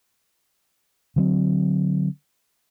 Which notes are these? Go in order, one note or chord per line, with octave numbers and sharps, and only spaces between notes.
D3 F#3 C4